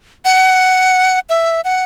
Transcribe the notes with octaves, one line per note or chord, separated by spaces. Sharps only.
F#5
E5
F#5